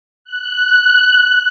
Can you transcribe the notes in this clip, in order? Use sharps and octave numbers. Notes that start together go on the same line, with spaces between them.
F#6